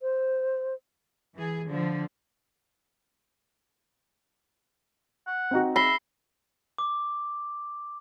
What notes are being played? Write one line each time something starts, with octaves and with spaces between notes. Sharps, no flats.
C5
E3 G#4
D3 F3
F#5
C4 D#4 F#4
E5 B5 A#6 C7 G7
D6